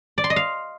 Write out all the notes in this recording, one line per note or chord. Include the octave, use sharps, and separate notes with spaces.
D5
C6
D#5
F5